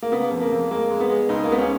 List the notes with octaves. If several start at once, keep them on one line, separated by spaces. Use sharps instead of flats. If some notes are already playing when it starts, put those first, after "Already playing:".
A#3
C#3 B3
F2
A#3
F2
G#3 A#3
G#3
B3
G#3
C#2 D#4
A#3
G#3 B3
C#4